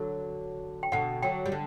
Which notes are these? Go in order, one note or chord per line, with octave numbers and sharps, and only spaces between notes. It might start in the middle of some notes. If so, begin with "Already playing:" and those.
Already playing: D3 F#3
G5
B2 D3 F#5
D3 F#3 G5
G3
D3